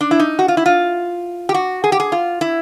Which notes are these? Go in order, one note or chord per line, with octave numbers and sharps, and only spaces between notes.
D4
E4
D#4
F#4
F4
E4
F4
G4
F#4
G#4
G4
G#4
F4
E4